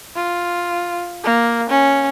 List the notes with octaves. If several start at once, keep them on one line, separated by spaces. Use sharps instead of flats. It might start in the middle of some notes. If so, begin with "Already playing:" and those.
F4
A#3
C#4